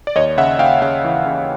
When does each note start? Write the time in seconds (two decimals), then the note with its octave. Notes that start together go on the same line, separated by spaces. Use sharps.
0.07 D5
0.16 D#2 C#5 D#5
0.37 C#3 E5 F#5
0.59 D#2 F5 G5
0.82 C#3 E5 F#5
1.05 E3
1.25 C#3